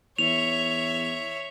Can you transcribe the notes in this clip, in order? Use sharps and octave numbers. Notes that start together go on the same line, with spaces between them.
E2 C#5 E5 F7